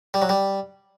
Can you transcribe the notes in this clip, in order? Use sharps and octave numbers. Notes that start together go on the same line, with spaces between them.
G3
F#3
G3